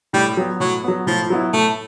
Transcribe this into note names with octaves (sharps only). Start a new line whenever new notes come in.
A2 G3
F#3 B3
A2 F#3
F#3 B3
A2 F3
F#3 B3 E4
A2 A3